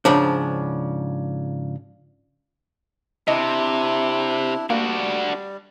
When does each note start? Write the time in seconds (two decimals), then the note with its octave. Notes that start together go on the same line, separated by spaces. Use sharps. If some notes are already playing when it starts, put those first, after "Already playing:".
0.05 G#2 C#3 F3 D4
3.28 C3 D4 E4 D#5
4.70 G3 A#3 D4 F#4